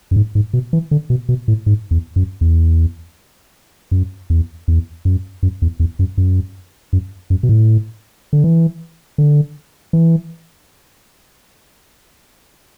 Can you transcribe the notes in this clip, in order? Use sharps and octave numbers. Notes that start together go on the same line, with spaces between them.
F#2
G#2
G#2
B2
E3
D3
B2
B2
A2
G#2
E2
F#2
E2
F#2
E2
E2
F#2
F#2
E2
E2
F#2
F#2
F#2
F#2
B2
A2
D3
E3
D3
E3